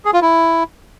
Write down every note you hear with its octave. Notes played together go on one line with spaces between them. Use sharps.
G#4
F4
E4